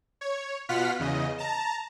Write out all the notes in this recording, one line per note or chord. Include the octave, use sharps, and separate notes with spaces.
C#5
B2 F4 F#5 F6 B6
E2 C#3 D#5
A5 A#5